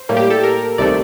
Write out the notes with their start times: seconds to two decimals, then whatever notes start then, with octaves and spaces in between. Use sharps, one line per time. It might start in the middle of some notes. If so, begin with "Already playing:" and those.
Already playing: C5
0.09 A2 G3 A#3
0.17 G4
0.30 A4
0.43 A#4
0.78 C2 C3 D#3 A3 D5